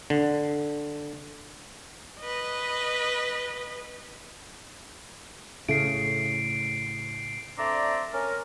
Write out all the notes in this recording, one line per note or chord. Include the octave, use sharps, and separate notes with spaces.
D3
B4 D#5
A2 C#3 A3 C7 D7
A3 C4 D4 D5 A#5
C#4 A#4